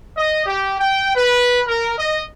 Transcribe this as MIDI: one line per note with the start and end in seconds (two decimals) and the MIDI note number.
0.15 0.42 75
0.46 0.76 67
0.78 1.14 79
1.14 1.59 71
1.67 1.91 70
1.97 2.19 75